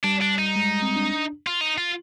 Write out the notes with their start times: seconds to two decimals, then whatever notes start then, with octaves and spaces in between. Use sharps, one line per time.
0.04 G3 D4
0.22 D4
0.39 D#4
0.56 G#3
0.82 C4
0.96 D4
1.47 F4
1.61 D#4
1.78 F4